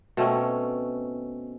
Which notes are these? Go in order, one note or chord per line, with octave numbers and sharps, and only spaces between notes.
B2 A3 C4 C#4